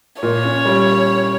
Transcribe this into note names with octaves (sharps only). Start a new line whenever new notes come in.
A#2 C#5
C#4
G3